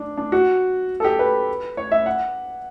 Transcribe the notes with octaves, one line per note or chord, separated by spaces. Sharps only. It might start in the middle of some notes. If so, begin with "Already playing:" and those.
Already playing: D4
D4
F#4
A4
G4
B4
C#5
E5
F#5